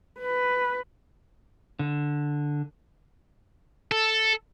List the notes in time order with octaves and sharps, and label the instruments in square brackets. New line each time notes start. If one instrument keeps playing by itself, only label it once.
[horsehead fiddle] B4
[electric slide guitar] D3
[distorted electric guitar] A4